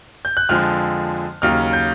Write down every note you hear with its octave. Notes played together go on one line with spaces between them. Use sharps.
G6
F#6
F2 D3 F3 G#3 F6
D#2 C#3 F#3 F6
G6